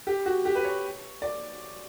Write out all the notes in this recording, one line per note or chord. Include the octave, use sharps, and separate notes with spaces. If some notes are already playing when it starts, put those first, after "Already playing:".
G4
F#4
G4
B4
C#5
D5